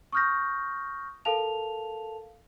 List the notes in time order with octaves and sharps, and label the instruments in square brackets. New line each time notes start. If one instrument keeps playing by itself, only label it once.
[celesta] C#6 D#6 F6 G6 A#6
A4 A#4 F5 A5 F7